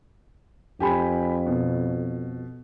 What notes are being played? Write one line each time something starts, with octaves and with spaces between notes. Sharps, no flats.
F2 G4 G#5 B5
B2